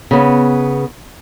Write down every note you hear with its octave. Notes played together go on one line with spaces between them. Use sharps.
C#3 B3